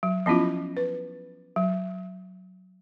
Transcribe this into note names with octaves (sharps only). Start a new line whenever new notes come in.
F#3
F3 B3 C#4 E4 F4
B4
F#3